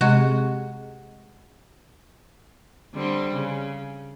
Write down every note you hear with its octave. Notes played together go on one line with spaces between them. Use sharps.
C3 G#3 F#4
D3 G3 C4
C#3